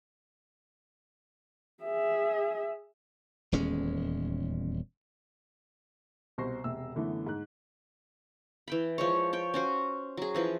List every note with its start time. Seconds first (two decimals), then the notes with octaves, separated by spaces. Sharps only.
1.83 G#4 E5
3.52 D#1 E2 G#3 C#4
6.38 C2 B2 C5 C#6 A#6 C7
6.64 E1 C3 E6
6.95 F#2 D3 E3 A3 B3
7.27 G#2 F#6
8.68 E3 G5 B5
8.98 F3 G#3 C#5
9.33 C#5 G5
9.54 C#4 F#4 C5
10.17 F#3 G#4
10.35 E3 F3 B4